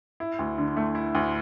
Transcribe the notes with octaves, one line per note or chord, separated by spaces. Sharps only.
E4
D2
D3
A3
E4
D2